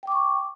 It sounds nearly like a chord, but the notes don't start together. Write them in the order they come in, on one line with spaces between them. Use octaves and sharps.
G5 D6 C#6